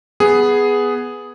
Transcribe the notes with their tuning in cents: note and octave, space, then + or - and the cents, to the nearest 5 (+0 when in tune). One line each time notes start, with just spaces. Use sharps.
B3 +0 G#4 +0